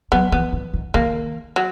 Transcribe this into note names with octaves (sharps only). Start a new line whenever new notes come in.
F#3 B3
E3 B3
E3
D#3
D#3 A#3
F#3